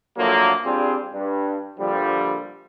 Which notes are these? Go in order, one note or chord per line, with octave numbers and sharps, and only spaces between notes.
D3 F3 F#3 A3 A#3
G3 C4 D4 F4 G4 G#4
G2
A#1 D3 F3 G3